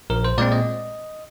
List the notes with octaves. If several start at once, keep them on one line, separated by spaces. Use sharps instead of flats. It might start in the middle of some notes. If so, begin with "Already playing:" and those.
A#1 A#4
C5
A#2 G#3 C4 D5
D#5